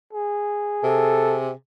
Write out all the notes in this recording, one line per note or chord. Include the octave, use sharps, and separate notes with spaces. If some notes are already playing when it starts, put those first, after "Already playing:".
G#4
C3 A4